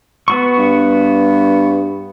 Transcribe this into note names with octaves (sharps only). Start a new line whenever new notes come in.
B3 F#4 C#6
G2